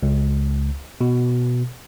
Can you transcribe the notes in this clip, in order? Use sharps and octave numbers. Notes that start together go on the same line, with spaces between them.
C#2
B2